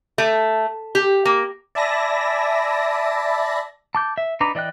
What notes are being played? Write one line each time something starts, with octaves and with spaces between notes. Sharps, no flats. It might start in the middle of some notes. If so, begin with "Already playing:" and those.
A3
G4
A#3
D5 E5 G#5 A5 B5 A#6
A5 D6 G6
E5
D4 D#4 B4 A#5 D6
E3 D5 D#5 G5 F#6